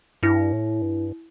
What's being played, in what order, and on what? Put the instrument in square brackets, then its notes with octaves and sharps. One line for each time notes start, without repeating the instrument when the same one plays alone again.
[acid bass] G2 [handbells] E4
[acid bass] A2
G2